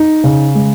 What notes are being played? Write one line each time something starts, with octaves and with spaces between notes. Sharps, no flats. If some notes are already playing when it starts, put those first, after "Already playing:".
Already playing: D#4
C#3
G#3